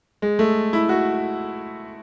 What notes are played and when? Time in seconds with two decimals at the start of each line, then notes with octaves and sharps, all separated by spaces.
0.22 G#3
0.39 A3
0.73 E4
0.89 F#4